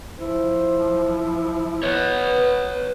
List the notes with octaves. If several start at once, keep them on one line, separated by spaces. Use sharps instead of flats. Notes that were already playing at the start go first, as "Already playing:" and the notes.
F3 E4 C5
B3 B4 C#5